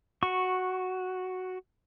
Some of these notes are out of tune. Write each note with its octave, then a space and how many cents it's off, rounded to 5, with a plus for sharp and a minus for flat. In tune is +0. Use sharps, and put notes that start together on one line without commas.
F#4 +0 C#6 -10